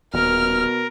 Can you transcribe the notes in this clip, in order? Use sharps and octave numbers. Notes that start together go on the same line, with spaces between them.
D#1 B2 A#4 F6